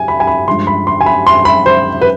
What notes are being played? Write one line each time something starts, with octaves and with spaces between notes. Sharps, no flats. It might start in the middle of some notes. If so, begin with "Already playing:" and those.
Already playing: G#5
B5
G#5
B5
G2 F3 G#3 C6
B5
C6
G#5
B5
C6
B5
C5
B4